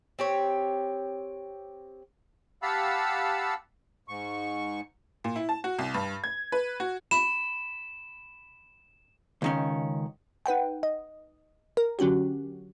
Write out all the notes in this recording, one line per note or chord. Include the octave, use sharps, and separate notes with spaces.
C4 G4 C#5
G4 F5 F#5 A5 B5 E6
G#2 C#6
A#2
E4
A5
F#4
C2
G2
G#6
B4
F#4
B5 E7
C#2 D#3 C#4
D#4 B4 F#5 G5
D#5
A#4
D3 F#3 C#4 F#4 G4